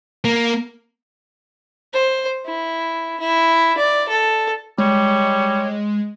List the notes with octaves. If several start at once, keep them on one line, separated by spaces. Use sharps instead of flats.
A#3
C5
E4
E4
D5
A4
G3 G#3 C#5